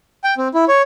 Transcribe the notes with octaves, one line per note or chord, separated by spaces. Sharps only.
G5
C4
E4
C#5